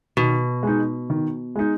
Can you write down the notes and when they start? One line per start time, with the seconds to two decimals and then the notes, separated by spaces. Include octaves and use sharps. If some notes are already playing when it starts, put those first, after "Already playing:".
0.17 B2 D#3
0.63 G#3 D#4
1.10 D#3
1.55 G#3 D#4